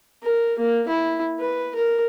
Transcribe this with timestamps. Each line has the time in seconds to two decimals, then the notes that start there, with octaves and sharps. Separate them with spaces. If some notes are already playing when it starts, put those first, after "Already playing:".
0.24 A#4
0.59 A#3
0.88 E4
1.40 B4
1.76 A#4